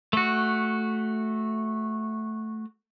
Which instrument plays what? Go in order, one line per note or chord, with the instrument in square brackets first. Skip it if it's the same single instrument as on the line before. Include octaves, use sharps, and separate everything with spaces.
[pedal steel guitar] A3 F#4